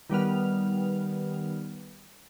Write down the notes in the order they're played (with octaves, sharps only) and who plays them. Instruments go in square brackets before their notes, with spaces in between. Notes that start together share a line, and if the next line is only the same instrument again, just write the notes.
[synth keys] D#3 G3 B3 F6